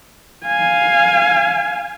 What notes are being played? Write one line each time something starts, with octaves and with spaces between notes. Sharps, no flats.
F5 G#5